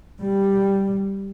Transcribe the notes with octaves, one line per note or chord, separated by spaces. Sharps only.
G3